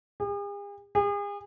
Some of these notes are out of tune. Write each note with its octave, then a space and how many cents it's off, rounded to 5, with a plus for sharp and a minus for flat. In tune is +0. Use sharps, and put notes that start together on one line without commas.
G#4 -45
G#4 -40